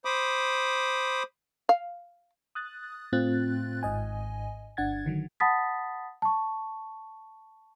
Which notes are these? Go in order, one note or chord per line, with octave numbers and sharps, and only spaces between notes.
C5 B5 D6 D#6
F5
D#6 F#6 A6
A2 A3 C4 F4 F#6 A6
G#1 G#2 D#5 G#5
G1 D4 F#5 G#6 A6
D3 D#3 F#3
F#5 A5 B5 D#6 A6 B6
A5 C#6